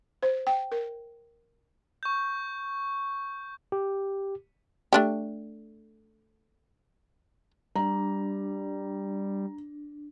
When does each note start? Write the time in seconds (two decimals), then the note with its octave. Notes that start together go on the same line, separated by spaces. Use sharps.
0.23 C5
0.47 G5
0.72 A#4
2.03 C#6 G6
3.72 G4
4.93 A3 D4 G4
7.76 G3 D4 A#5